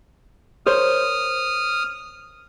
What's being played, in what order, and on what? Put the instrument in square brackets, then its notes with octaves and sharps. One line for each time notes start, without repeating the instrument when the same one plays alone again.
[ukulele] A#4 C5 C#5 [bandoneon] D#6 F6